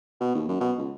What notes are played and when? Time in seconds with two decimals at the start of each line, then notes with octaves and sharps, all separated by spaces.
0.20 B2
0.35 D#2
0.48 F#2
0.60 B2
0.78 C#2